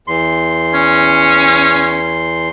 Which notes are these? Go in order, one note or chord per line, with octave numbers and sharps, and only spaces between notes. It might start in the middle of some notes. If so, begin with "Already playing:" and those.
E2 C6
C#4